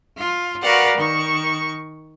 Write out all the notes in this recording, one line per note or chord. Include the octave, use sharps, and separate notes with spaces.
F4
F#4 A#4 B4 D5 F5 F#5
D#3 C#6